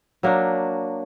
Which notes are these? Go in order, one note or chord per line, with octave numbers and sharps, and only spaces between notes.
F#3 A#3 D4